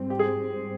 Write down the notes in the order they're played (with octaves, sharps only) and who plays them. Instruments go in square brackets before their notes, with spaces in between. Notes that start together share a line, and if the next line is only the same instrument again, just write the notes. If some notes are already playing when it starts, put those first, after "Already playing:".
Already playing: [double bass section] G#2 G3 C4
[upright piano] G4
G#4